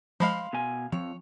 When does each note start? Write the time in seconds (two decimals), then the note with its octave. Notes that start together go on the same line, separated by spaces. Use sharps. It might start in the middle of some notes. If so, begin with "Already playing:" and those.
0.20 F3 G#3 F5 B5 C6
0.53 B2 G#5
0.92 F2 F3 C#5